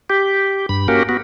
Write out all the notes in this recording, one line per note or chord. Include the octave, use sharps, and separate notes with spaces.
G4
G2 B5
A#3 C#4 F#4 G4 A#4
B3 F#4